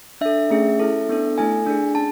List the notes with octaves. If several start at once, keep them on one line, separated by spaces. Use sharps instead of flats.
D4 A4 E5
A3 C#4 G#4
C#4 E4 A4
B3 D4 A4
A3 E4 A4 G#5
D4 G#4
C#4 G#4 A5